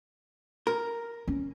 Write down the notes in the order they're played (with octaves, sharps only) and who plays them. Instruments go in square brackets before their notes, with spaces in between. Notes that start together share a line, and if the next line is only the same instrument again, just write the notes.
[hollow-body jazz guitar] A#4
[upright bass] C#4